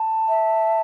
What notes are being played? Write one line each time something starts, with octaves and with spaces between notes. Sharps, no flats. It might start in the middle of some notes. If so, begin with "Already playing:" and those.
Already playing: A5
E5